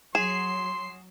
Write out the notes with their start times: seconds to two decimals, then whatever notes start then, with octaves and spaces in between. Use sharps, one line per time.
0.15 F#3 G#4 C6 C7 E7